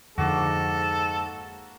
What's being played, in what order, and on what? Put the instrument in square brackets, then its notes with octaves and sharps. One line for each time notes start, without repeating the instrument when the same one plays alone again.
[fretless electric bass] F2 D3 [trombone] G#2 [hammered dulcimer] A#3 F#4 [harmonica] A4